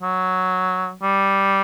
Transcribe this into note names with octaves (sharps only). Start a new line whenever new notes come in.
F#3
G3